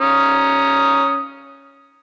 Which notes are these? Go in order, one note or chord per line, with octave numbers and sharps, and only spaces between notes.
C#4 A#5 D#6